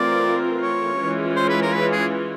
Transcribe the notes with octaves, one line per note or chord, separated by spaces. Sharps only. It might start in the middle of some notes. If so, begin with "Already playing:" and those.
Already playing: E3 A3 C4 F4 A#4 D5
C#5
E3 G#3 C#4 F4
C5
B4
A#4
B4
G#4